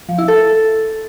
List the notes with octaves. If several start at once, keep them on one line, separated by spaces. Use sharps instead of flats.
F3
E4
A4